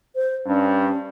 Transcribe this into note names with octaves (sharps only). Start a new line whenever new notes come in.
C5
G2 C#4